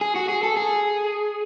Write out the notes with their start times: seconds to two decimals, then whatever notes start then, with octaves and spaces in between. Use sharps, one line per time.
0.01 G#4
0.15 F#4
0.29 G#4
0.43 A4
0.57 G#4